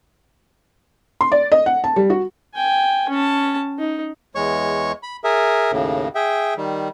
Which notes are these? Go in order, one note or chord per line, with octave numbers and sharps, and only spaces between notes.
C6
D5
D#5
F#5
A5
G3
F#4
G5 G#5
C#4 A5
D#4
E2 G#3 C#5 C#6
B5
G#4 A#4 E5
D#2 A2 C#3
G#4 E5 G5
D#3 G3